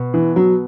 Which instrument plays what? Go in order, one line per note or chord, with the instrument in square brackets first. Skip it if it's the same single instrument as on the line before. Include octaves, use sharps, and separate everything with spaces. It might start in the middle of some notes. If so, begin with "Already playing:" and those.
Already playing: [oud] B2
[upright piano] E3
F#3